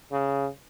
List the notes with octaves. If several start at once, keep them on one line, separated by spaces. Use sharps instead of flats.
C#3